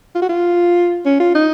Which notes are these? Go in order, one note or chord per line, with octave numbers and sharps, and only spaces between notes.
F4
F#4
F4
C#4
F4
D#4